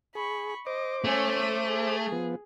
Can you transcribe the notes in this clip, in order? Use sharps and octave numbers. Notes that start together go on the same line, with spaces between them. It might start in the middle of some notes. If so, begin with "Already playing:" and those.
G#4 B5 C#6
C5 D#5 D6
A3 C#4 G#5
D#7
G#4
F3 B3